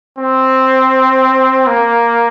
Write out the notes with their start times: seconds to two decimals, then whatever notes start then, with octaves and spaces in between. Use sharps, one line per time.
0.18 C4
1.67 A#3